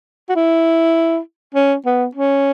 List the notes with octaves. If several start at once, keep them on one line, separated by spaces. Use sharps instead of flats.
F#4
E4
C#4
B3
C#4